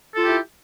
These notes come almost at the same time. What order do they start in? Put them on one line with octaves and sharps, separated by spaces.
A4 F4 G4 E4